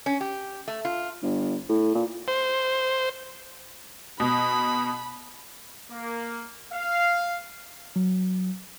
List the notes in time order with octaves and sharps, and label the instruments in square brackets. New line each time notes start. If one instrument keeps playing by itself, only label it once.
[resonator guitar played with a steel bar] C#4
G4
A3
F4
[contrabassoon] G1
A2
A#2
[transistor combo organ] C5
[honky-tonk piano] B2 [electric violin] B5
[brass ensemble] A#3
F5
[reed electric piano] F#3